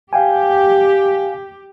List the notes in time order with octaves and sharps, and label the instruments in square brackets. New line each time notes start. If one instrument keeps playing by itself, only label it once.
[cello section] G4 [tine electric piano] F5 G5 G#5